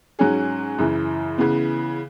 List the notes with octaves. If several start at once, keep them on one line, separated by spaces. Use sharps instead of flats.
G#2 F#3 C#4 G#4
F#2 C#3 E3
C#3 E3 B3